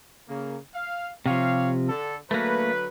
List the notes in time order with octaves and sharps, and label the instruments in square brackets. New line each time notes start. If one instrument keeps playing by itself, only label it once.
[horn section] C#3 A#3
F5
[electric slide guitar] C3 F3 [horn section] G4 C#5 F5
[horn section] D3 A4
[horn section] D3 F#3 B4 [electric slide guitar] A3 A#3